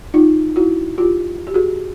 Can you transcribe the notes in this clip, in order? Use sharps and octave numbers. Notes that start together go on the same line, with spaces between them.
D#4 F4
E4 F#4
F4 G4
G4
F#4 G#4